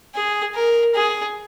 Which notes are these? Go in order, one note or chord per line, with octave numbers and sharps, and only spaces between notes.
G#4
A#4
G#4